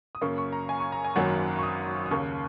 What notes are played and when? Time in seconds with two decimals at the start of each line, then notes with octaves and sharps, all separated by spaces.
0.15 D#6
0.21 F#2 C#3 A#3 C#6
0.38 C#6
0.52 A#5
0.69 G#5
0.80 C#6
0.92 A#5
1.04 G#5
1.16 G#1 F#2 D#3 F#3 A#3 F#5
1.59 C#6
1.63 D#6
2.06 D#6
2.11 D#2 C#3 A#3 C#6